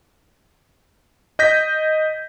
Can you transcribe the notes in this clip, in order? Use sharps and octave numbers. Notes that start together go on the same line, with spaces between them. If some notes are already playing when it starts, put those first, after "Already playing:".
D#5 G6 A#6 B6